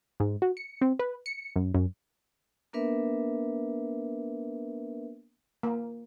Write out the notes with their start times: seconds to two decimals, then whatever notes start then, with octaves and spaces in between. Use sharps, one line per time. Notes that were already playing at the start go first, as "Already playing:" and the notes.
0.20 G#2
0.42 F#4
0.57 C#7
0.81 C4
0.99 B4
1.26 C#7
1.56 F#2
1.74 F#2
2.73 A#3 B3 D4 A#4 B4 E5
5.63 A#3